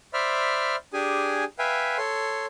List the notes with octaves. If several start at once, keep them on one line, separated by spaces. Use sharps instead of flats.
C5 D5 E5 B5 F6
D4 G4 G#4 G#5
B4 E5 F5 G5 G#5
A4 C#5 C6